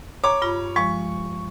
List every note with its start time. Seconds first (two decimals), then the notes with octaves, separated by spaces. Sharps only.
0.24 C#5 A#5 D6
0.42 G2 F4 B5
0.76 F3 G#3 C#6